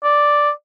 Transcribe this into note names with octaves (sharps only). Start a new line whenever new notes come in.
D5